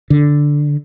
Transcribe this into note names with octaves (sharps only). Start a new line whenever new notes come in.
D3